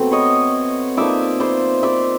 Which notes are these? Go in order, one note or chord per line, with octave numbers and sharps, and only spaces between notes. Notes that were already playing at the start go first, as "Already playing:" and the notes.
Already playing: B2 F#3 A3 C4
C#5 D#5
F3 A#3 D#4 D5 E5
C5 D5
D5 E5